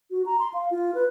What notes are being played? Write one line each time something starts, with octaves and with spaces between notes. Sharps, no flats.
F#4
A#5
C6
F5
F4
B4